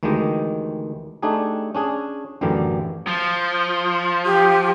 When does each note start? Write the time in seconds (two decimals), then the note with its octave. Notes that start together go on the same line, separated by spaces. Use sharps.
0.03 D2 D#3 E3 G#3 G4 D#5
1.23 A3 D4 D#4 G4 G#4
1.75 C#4 D4 G#4
2.41 A1 F#2 D3 E3 G4 A#4
3.07 F3
4.25 G4